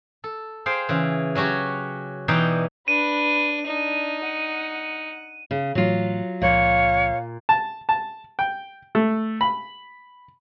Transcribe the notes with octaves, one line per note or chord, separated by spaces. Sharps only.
A4
G#4 C5 F5 G5
C#3 E3
F#3 C#4 F#4 G4 C#5
B2 E3 D#4 D5 G5
D4 B4 D#7
D4 D#4
F#5
C#3
A2 E3 F#3 A3 F4
C#2 A#2 F3 C#5 F5
A5
A5
G5
A3
B5